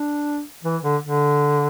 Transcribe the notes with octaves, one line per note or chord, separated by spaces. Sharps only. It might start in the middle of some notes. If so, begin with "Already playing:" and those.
Already playing: D4
E3
D3
D3